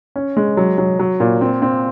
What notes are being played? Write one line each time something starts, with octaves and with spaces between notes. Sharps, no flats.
C#4
G#3
F#3
F#3
F#3
A#2
C4
C4